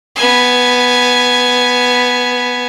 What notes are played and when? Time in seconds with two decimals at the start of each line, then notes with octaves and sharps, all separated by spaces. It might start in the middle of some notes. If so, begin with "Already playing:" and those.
0.16 B3 G#5